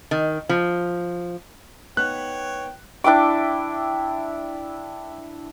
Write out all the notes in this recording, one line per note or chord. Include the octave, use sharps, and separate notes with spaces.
D#3
F3
B3 D#4 C#5 G5 F#6
D4 E4 G5 D6